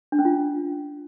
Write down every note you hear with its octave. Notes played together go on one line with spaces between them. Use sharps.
D4
C#4
F4